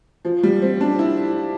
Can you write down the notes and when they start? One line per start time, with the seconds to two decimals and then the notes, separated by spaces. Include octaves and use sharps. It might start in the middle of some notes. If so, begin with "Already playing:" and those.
0.25 F3
0.43 G3
0.62 C4
0.81 D4
0.99 E4